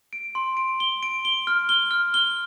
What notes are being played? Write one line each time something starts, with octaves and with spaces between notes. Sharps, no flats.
D7
C6
D7
G7
D7
G7
F6
G7
F6
G7